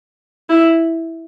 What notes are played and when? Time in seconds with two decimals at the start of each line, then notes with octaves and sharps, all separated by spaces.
0.49 E4